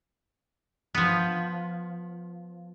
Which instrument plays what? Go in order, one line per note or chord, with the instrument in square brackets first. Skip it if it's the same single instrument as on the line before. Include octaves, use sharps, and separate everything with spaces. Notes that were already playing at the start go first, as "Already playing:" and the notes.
[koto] F3 B3